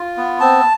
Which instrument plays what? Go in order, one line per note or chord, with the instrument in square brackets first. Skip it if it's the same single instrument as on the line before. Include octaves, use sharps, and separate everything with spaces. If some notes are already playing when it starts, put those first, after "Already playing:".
Already playing: [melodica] F4
B3
C4 A5